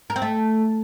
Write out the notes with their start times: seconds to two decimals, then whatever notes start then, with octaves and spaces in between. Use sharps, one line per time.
0.10 A#4
0.16 C4
0.22 A3